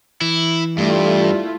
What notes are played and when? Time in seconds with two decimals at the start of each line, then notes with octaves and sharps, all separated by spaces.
0.21 E3 E4
0.78 G2 G3 A3 E4 F4